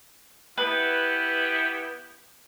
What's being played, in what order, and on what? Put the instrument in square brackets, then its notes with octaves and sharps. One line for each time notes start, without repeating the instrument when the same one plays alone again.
[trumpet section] B3 E4 G4 [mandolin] B4